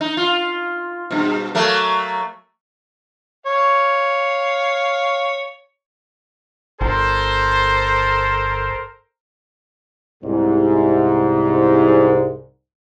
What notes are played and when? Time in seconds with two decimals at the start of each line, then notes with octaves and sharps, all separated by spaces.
0.01 D#4
0.17 F4
1.11 G2 B2
1.55 F#3 A3 A#3
3.46 C#5 F5
6.81 G1 A4 A#4 C5
10.24 C2 G#2